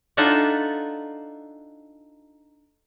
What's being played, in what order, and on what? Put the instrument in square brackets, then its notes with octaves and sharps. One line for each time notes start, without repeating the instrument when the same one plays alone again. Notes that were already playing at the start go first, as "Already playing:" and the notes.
[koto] D4 D#4 F4 A4 E5 F#5